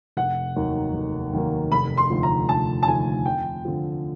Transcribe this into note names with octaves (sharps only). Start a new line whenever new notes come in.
F1 F#5
D#2 D#3 F#3 A#3
F1
D#2 D#3 F#3 A#3
F1 B5
C6
D#2 D3 F3 A3
A#5
F1 A5
A5
D#2 D3 F3 A3 G#5
F2 G5
D3 F3